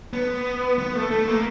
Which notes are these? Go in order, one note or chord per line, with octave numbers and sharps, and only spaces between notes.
B3
B3
A3
A3
A#3